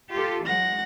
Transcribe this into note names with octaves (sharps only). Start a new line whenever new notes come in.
F4 G4 A4
E3 F#3 G#3 F#5 A#6